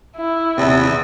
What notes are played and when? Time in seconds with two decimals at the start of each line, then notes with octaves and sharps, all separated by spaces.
0.16 E4
0.58 D#1 E2 C3